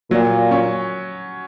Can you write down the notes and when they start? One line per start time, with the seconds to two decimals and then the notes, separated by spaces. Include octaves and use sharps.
0.11 A#2 F#3
0.51 C#4